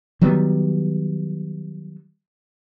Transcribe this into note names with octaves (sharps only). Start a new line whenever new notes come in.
D#3 F#3 G3 B3